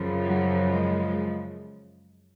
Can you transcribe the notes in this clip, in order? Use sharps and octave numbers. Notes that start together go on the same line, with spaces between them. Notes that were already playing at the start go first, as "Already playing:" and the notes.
Already playing: F#2 C#3 F3
F#3
G#3